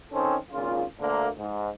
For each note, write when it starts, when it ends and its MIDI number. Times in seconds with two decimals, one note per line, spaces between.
0.12 0.36 51
0.12 0.36 60
0.12 0.36 61
0.12 0.36 63
0.12 0.36 69
0.12 0.36 72
0.51 0.83 32
0.51 0.83 46
0.51 0.83 49
0.51 0.83 65
1.00 1.28 38
1.00 1.28 50
1.00 1.28 58
1.37 1.69 44